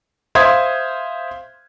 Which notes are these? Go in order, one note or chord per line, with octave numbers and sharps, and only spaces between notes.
C5 E5 F5 C6 D#6 G#6